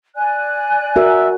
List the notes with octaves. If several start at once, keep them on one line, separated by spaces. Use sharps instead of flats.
D5 G#5 F#6
F#4 A#4 E5